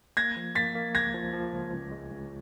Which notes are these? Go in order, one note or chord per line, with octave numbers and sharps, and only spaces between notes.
A#3 G#6 A#6
F3
A#3 A6 B6
A#3
C#2 G#6 A#6
F3
F3
C#2
C#2
G#3
C#2